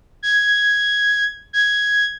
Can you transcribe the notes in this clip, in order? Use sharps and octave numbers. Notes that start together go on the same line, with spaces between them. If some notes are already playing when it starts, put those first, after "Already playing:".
G#6
G#6